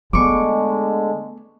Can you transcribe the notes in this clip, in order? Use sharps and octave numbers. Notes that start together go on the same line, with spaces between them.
D3 G#3 A3 B3 C#6 D6